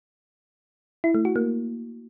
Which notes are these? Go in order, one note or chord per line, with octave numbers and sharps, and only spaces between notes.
E4
A3
F#4
A#3